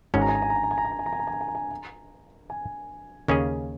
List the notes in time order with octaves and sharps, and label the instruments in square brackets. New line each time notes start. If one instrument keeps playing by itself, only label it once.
[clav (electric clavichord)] G#1 G#2 G#3 C#4 F#4 [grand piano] G#5
[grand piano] A#5
G#5
A#5
G#5
A#5
G#5
A#5
G#5
A#5
G#5
A#5
G#5
A#5
G#5
A#5
G#5
A#5
G#5
A#5
G#5
A#5
G#5
[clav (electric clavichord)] D#2 C#3 A#3 C#4 G#4